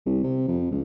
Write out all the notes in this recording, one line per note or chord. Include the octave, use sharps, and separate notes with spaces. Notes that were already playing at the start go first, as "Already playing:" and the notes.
C2
C3
F2
C#2